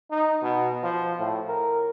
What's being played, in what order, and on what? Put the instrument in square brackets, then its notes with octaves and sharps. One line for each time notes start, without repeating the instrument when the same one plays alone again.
[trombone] D#4
B2
F3
A2
A#4